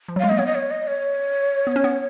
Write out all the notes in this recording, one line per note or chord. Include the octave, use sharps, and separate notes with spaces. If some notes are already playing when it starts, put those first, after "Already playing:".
F3
F#3
G#3 F5
A#3 D#5
B3 C#5
D#5
C#5
D#5
C#5
B3
C#4
B3